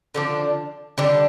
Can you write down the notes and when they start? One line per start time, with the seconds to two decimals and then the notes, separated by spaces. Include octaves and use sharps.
0.14 D3 F3 D4
0.98 D3 G3 D4